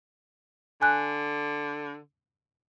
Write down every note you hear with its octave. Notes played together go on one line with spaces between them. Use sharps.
D3 G#5 F#6